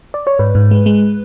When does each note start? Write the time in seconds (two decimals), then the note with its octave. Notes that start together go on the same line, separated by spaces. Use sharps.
0.14 D5
0.27 C#5
0.39 G#2 B4
0.55 G#2
0.71 G#3
0.86 G#3